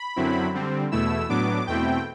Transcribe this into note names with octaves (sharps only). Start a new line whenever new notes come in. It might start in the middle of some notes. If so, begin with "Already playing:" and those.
Already playing: B5
F#2 D3 F#3 C4 E4
D3 G3 C4
E2 B2 A3 E4 E6
A2 F#3 B3 D4 D6
E2 B2 A3 C4 E4 G5